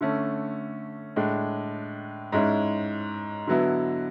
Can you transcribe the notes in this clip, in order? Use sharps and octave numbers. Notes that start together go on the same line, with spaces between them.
D3 A3 C#4
A2 G#3 D4
G#2 G#3 C#4 E4
D3 F#3 B3 E4